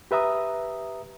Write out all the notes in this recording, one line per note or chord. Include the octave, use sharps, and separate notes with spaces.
G4 B4 E5 A#5 D#6